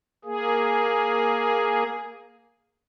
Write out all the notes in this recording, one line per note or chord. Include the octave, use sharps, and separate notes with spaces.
A#3 G#4